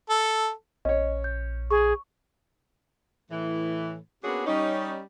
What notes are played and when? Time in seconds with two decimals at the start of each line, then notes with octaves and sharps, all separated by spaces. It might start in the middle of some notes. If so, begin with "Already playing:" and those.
0.09 A4
0.85 A#1 C#4 C#5 D#5
1.24 G6
1.71 G#4 C#6
3.31 A2 E3
4.24 A#3 B3 C#4 D4 F#4 G#4
4.46 G3 C#4 D#4